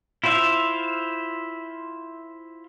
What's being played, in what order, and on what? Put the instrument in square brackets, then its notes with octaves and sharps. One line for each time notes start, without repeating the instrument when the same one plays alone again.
[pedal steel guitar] E4 F4 C5 E5 F5